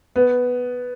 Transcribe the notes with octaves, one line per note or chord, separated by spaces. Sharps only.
B3